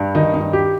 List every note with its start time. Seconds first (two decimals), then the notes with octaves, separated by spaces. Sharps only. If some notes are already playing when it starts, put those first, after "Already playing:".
Already playing: G2
0.15 D#3 D#4
0.34 D#4
0.40 G2
0.53 G4